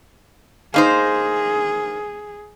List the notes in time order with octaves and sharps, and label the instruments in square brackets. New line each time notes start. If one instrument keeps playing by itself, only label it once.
[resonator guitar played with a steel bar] A#3 D#4 C5 [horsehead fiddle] G#4